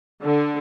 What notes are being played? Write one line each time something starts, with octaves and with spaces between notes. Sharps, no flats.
D3